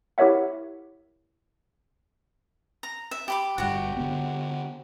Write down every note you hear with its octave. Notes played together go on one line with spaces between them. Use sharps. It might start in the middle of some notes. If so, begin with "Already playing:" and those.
E4 G4 A#4 C#5 E5 F#5
A#5
E5
G4 B5 D6
G1 G2 F#4 G4
D3 B3